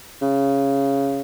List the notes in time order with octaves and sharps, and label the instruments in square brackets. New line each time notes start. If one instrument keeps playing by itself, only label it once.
[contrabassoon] C#3